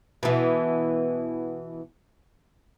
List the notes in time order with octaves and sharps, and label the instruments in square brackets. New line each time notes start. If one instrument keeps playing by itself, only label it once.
[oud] B2 E3